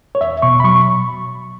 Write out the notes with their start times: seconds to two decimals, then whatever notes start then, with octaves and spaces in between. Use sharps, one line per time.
0.15 C#5
0.21 E2 E5
0.42 B2 C#6
0.60 B5
0.64 F#3 C#6